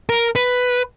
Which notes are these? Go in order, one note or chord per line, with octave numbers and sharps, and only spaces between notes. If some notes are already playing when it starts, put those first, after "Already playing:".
A#4
B4